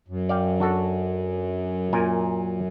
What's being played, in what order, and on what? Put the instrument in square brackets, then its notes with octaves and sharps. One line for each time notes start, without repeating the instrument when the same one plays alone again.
[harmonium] F#2
[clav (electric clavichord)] D5 F5 G5
D4 F#4 A4
A#2 A#4 G#5